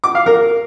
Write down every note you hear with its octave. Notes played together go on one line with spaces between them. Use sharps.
D6
F5
A#4